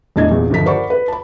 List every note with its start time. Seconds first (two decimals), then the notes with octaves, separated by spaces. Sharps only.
0.16 E1 A2 D4 E4 D#5 G#6
0.31 G#1 E2 A#2
0.50 G1 D#2 F3 D#4 B6
0.66 A#4 C5 D5 F#5 B5 C#6
0.90 B4
1.08 A5 B5